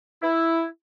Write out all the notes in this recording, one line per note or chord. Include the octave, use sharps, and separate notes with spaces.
E4